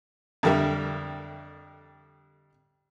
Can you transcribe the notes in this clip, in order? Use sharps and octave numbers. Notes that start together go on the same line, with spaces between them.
F2 D3 G3 A#4 E5